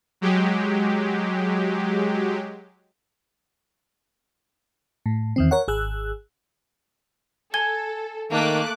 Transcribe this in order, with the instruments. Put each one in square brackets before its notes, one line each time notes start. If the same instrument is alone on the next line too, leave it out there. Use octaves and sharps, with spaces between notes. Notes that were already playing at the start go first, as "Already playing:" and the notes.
[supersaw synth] F#3 G#3 G4
[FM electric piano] A2
E2 D#3 C4
A#4 C#5 F#5
G#1 G#4 E6 F#6
[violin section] A4 [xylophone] G#5 G#6 G7
[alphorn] D#3 [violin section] A3 D6 F#6 [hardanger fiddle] A#3